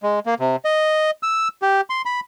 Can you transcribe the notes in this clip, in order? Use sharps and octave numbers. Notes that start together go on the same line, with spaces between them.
G#3
A#3
C3
D#5
E6
G4
C6
B5